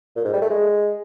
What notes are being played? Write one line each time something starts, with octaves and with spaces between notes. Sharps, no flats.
A#2
G#2
G3
A3
G#3